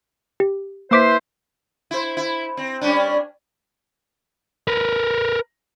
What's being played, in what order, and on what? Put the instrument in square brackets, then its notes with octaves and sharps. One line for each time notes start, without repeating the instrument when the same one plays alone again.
[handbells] G4
[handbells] A#3 D6 B6 [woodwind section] E4 B4 C5
[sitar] E4 C5
E4
C4
G3 C#4 D4
[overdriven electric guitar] A#4 B4